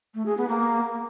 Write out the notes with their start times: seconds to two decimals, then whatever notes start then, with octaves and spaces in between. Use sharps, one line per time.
0.15 A3
0.26 G#4
0.37 B3
0.49 A#3